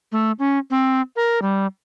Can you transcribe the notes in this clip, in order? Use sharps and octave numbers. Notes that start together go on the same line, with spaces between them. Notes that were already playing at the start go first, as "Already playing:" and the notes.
A3
C#4
C4
A#4
G3